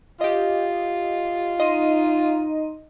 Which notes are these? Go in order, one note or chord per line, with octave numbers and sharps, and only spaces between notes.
F4 G4 D#5
D#4 D#5 C6 D#7